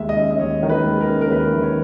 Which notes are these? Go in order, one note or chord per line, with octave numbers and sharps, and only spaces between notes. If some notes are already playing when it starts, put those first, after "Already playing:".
Already playing: D#2 D#3 G#3 E5
D#5
C#4
D#5
D#2 C#5
D#3
B4
G#3
A#4
C#4
A#4
D#2 B4
D#3
C#5